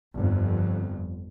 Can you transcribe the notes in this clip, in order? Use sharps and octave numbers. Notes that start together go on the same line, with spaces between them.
G1 F2